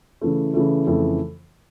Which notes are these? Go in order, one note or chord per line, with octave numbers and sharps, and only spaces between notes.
C#3 E3 A3
C#3 E3 A3
F2 C#3 E3 A3